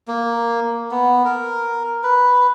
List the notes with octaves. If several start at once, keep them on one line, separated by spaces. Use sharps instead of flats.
A#3
B3
A#4
B4